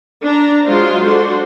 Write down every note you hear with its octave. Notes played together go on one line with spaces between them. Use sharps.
D4 A#5
F#3 G#3 F4 C5
D4 F#4 A4 C5